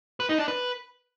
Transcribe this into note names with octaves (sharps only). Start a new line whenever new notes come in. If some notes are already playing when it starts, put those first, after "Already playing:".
B4
D#4
D4
B4